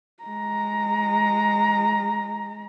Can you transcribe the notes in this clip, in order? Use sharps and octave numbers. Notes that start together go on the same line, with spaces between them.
G#3 A#5